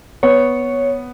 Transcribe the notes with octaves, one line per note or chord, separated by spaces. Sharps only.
B3 C#5